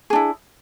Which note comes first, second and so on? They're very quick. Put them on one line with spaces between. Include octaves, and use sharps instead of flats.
G#4 D4 E4